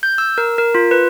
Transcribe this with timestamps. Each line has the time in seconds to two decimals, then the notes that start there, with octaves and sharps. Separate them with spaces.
0.03 G6
0.18 E6
0.38 A#4
0.58 A#4
0.75 F4
0.91 B4